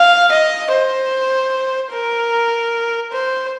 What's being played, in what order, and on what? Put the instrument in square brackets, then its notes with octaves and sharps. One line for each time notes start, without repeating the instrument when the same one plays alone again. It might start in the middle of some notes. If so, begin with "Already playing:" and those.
Already playing: [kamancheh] F5
D#5
C5
A#4
C5